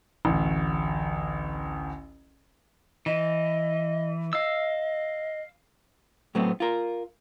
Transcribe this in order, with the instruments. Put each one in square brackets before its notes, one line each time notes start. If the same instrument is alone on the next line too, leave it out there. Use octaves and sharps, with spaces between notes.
[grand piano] A1 D2
[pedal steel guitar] E3 [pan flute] D#5
[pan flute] D#5 [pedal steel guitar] F5 E6
[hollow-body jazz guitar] A2 F#3 A3 B3 C4
F4 A#4